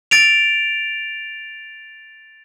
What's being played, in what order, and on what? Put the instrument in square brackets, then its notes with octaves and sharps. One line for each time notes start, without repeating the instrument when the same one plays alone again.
[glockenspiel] A6 D7 F7